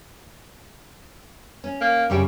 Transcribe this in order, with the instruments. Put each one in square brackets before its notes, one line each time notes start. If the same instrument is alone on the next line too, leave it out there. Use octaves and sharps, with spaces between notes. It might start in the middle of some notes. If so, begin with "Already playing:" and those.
[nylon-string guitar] C#4
[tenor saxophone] A#3
[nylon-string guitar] F#2 C#3 G5 [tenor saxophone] G3